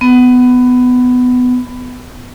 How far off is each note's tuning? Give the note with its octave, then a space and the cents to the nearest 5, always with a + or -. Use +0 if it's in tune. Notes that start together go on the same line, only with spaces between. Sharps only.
B3 +15